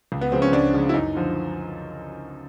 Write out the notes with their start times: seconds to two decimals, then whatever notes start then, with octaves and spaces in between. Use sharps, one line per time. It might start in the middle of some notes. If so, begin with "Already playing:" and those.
0.12 C#2
0.21 B3
0.32 C#3 F3 G#3 C4
0.42 C#4
0.52 C#2 D4
0.73 C#3 F3 G#3
0.89 E4
0.93 F#2 D#4
1.15 D3 F3